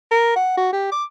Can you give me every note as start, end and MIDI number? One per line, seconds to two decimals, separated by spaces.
0.11 0.33 70
0.36 0.55 78
0.57 0.69 66
0.73 0.90 67
0.92 1.04 86